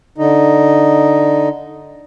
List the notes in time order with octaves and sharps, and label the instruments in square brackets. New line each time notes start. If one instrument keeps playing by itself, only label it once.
[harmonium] D3 D#4